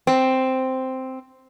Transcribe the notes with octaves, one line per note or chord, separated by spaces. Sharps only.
C4